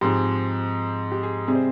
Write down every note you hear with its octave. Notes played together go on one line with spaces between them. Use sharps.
G#2 F3 G#3 C4 G4
G4
G#4
C3 G3 C4 G#4
C5